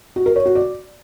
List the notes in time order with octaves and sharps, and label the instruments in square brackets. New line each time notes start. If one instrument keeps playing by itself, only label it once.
[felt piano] F#4
A#4
C#5
F#4
D5